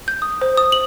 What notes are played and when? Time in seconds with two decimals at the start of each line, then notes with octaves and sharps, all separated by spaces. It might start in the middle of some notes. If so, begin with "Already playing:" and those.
0.08 G6
0.22 D#6
0.42 C5
0.57 D#6
0.72 F#7